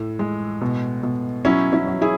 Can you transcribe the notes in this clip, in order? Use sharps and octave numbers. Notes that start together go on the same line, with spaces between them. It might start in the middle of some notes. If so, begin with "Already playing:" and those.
Already playing: A2 A3
G#3
B2
B2
F#3 C#4 E4
C#4 E4
F#3
E4 G#4